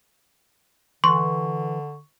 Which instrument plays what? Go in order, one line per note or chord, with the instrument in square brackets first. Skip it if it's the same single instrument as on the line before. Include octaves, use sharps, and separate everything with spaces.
[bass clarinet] D3 [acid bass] E3 [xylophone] C6 [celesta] C#6